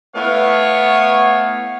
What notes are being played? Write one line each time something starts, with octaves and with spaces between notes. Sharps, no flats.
A3 B3 E4 B4 C#5 F5